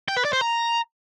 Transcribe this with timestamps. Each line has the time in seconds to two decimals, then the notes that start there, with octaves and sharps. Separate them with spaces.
0.08 G5
0.17 B4
0.25 D5
0.33 C5
0.41 A#5